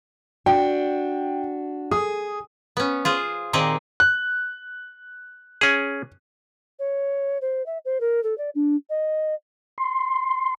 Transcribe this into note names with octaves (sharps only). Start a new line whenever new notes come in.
D4 F#4 G5
G#4 D#6
B3 C#4
F4 G#4 C5
A#2 D#3 C4 D#4 G4 G#4
F#6
C#4 G#4
C#5
C5
E5
C5
A#4
A4
D5
D4
D#5
C6